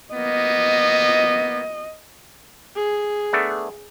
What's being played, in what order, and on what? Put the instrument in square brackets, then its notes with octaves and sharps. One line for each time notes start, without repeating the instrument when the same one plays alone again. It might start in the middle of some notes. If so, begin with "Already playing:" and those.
[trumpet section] A#3 B3 [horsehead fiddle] D#5
[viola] G#4
[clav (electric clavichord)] A3 B3 D4